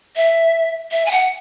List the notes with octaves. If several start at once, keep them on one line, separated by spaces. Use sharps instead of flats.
E5
E5
G#5
F#5